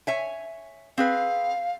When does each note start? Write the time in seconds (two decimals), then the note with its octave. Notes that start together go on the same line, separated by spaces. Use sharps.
0.07 C#5 E5 G#5
0.98 C4 G#4 B4 F5